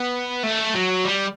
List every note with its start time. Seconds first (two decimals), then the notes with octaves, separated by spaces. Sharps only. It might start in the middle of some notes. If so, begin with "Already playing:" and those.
Already playing: B3
0.44 A3
0.75 F#3
1.05 G3